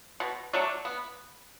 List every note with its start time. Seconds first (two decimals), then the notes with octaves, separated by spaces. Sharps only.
0.20 B2
0.53 F#3 A3 D4
0.85 B3